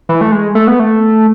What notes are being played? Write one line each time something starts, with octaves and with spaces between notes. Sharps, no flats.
E3
A3
G#3
A3
B3
A3